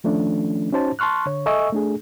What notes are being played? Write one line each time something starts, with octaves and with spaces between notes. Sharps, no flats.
D#3 F3 A3 C#4 D4
C#4 D#4 F#4 C5 C#5 A5
A5 C6 C#6 F6 F#6
D3 C#5
A4 D#5 E5 G#5 C#6 E6
A3 D4 G#4